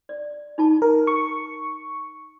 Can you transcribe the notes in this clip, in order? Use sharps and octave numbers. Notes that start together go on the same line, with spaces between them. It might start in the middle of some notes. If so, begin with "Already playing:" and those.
D5
D#4 F4 A5
A#4
C#6